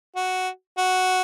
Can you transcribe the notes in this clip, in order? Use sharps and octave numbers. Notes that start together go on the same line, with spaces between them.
F#4
F#4